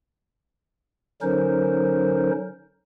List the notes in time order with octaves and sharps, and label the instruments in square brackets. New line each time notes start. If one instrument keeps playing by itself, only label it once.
[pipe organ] D3 F#3 C#4 D#4 A#4 C5